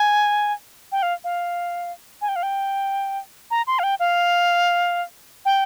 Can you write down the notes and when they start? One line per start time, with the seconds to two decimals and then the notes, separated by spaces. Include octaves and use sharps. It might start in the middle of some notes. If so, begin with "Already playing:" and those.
Already playing: G#5
0.92 G5
1.03 F5
1.24 F5
2.22 G#5
2.29 G5
2.36 F5
2.43 G5
3.51 A#5
3.67 C6
3.79 F5
3.83 G5
4.00 F5
5.45 G5